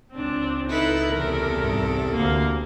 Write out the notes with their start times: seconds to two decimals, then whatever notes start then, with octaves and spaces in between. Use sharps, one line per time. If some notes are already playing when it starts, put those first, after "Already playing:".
0.12 C#2 C4 D4
0.70 D#4 E4 A4 B4
1.11 E2 C3 A4 A#4
1.55 C2 G#2 G3
2.12 D2 A#3 F5